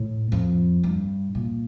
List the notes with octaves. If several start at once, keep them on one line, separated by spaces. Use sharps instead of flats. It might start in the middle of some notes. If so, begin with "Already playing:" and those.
Already playing: A2
F2
G2
A#2